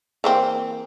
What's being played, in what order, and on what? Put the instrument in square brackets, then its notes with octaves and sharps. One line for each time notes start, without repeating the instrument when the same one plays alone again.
[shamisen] E3 A#3 C4